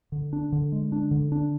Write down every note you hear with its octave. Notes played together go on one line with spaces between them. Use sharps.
D3
D4
D3
G#3
D4
D3
D4